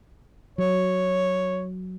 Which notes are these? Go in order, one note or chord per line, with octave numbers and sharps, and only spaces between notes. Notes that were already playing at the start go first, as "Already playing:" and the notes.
F#3 C#5